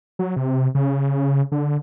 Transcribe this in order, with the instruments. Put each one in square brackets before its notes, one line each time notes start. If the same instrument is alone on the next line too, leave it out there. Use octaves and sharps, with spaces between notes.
[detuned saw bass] F#3
C3
C#3
D3